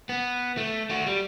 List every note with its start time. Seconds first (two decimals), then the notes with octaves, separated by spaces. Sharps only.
0.09 B3
0.57 A3
0.90 A3 F#4
1.06 G3